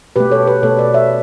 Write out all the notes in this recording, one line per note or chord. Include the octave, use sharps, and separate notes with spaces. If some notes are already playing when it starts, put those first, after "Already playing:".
B2 A3 G4 B4
A4 C#5
G4 B4
B2 A3 A4 C#5
B4 D5
C#5 E5